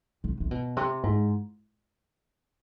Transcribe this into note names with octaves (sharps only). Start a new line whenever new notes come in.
C3
C3
B2
C3
G#2